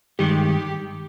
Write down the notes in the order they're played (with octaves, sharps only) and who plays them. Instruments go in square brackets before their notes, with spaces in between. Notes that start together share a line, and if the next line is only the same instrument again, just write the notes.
[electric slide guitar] G2 D#3 G#3 [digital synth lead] G4